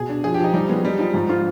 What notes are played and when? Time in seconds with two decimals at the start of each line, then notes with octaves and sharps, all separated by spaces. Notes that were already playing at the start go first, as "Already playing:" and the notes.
Already playing: B2 G#4
0.09 D4
0.24 F3 G#4
0.34 G4
0.40 F3 D#4
0.53 G3 D#4
0.69 G#3 B3
0.84 G3 D#4
0.98 F3 D#4
1.14 G#2 F3
1.29 F4